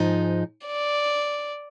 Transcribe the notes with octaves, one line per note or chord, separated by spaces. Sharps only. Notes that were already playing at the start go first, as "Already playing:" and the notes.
Already playing: G#2 F3 G#3 D#4
D5